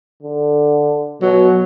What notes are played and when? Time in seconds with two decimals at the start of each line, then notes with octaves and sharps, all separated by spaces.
0.23 D3
1.22 B2 F#3